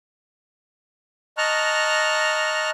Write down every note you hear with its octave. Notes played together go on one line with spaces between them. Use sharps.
D#5 A5 A#5 C#6 F6 F#6